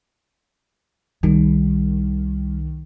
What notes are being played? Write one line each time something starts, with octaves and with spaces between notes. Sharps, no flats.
C2 D#3 G3